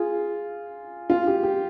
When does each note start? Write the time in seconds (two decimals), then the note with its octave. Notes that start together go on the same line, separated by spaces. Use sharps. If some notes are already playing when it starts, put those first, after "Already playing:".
Already playing: F4 G#4
1.10 F4
1.27 G4
1.43 G4